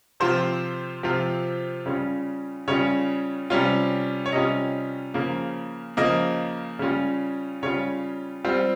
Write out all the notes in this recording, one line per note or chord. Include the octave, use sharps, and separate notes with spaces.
C3 F3 C4 F4 C5
C3 F3 C4 F4
C#3 G3 C#4 F4
C#3 G3 C#4 F4 C#5
C3 G3 C#4 F4
C#5
C3 G3 C#4 F4 D#5
C#3 F3 A#3
C#3 F3 A#3 D#5
C#3 G3 C#4 F4
C#3 G3 C#4 F4 C#5
G3 C4 F4